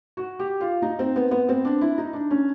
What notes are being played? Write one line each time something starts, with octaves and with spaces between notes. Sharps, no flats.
F#4
G4
F4
D#4
C4
B3
B3
C4
D4
E4
D#4
D4
C#4